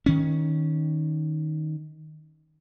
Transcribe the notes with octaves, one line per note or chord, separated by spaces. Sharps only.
D#3 C#4